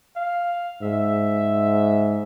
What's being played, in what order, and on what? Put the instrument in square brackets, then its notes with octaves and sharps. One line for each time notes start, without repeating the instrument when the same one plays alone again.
[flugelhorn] F5
[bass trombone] G#2 [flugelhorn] E5